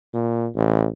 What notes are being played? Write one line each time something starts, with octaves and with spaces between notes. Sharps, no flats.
A#2
A1